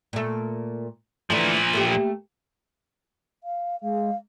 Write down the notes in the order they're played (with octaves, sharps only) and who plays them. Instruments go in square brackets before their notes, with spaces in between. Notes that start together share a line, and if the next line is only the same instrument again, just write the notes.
[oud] A#2 A3
[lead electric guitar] A#2 F3 [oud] D3 E3 A3
[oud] A3 A#3 G4
[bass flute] F5
[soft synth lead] G#3 [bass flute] F5